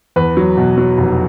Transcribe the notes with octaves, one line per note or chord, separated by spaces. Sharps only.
E2 B4
F#3
B2
F#3
F1